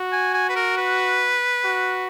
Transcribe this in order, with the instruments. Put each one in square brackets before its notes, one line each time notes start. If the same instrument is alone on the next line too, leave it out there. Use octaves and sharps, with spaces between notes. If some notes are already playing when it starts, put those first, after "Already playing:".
Already playing: [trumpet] F#4
[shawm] G#5
G#5
B4
A#4
B4
[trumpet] F#4